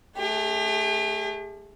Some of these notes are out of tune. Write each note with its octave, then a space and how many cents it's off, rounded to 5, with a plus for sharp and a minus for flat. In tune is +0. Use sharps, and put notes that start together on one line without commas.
A3 -20 G4 +45